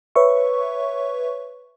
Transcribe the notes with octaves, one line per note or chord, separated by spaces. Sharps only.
B4 C#5 E5 C#6